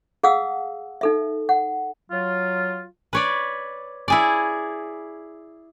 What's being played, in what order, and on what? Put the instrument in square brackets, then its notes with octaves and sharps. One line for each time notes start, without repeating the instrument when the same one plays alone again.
[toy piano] G#4 F5 F#5 D#6 E6
D#4 A4 E5
F#5
[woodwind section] F#3 F4
[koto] B4 C#5 D5
E4 G#4 D5